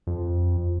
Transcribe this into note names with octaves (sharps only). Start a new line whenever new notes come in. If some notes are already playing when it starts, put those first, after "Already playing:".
F2